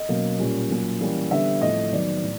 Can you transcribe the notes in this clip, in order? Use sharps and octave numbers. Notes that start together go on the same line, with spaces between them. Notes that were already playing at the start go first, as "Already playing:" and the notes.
Already playing: D#5
B2 F#3 A#3 C#4
A#2 G3 A#3 C#4
A#2 F#3 A#3 C#4
E3 G3 A#3 C#4
D3 G3 B3 E5
A2 F3 A3 C4 D#5
D#3 F#3 B3 D5
A2